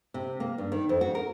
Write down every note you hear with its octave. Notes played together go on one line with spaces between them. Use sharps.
C3
A#3
G2
D#3
F2
F#4
A#4